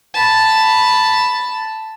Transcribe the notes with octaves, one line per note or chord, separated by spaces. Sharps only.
A5 B5